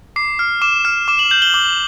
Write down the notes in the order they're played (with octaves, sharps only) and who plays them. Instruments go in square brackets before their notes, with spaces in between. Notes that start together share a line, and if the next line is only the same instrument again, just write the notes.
[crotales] D6 C7
F6
D6 E7
F6
D6 E7
F#7
G6 F#7
G7
D6 F#7